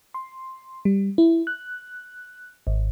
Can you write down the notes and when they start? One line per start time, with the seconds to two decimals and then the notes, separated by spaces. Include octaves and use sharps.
0.14 C6
0.85 G3
1.18 E4
1.47 F#6
2.67 G#1